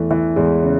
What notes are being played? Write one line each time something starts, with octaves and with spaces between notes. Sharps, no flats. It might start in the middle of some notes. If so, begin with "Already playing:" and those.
Already playing: E2 E3 A3
E3
E2 G#3
C#3